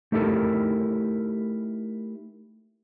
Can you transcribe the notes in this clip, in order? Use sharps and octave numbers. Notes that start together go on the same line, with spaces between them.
A3 D#4 E4 G4 A4 A#4